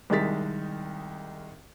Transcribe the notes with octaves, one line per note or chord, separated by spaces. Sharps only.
C2 D#3 G#3 A6 B6